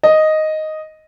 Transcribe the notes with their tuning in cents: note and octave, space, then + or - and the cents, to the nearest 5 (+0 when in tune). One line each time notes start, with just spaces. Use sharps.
D#5 +0